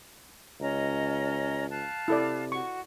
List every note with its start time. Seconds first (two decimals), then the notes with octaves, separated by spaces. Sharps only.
0.60 C#2 C#4 D#5 A#5
1.70 F5 A5 F#6
2.08 C3 E4 A4 D5
2.52 F#4 C#6